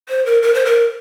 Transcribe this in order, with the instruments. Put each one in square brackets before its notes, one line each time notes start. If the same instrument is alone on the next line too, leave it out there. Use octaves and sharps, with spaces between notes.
[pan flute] C5
A#4
A#4
C5
A#4